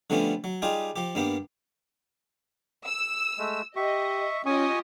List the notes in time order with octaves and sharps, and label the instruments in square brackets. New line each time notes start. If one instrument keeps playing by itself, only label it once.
[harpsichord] D3 F3 G3 A3 B3 C#4
F#3
G3 D#4 F4 G4 G#4
F3 G4
G2 A#3 B3 G4
[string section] E6
[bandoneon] G#3 A3
[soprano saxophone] G4 [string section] D#5 [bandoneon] E5 C#6
[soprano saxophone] C#4 [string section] F4 G4 D#5 [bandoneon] G#5 C#6 D#6